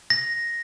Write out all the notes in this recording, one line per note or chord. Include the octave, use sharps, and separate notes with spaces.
A#6